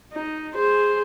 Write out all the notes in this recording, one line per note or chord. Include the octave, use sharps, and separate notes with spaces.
D#4
G#4 C5